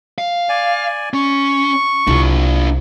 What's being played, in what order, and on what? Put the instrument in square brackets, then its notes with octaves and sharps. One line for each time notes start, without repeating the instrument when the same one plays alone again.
[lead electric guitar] F5
[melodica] D5 G#5
[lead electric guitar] C#4 [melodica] C#6
[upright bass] C2 [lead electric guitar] D4 F4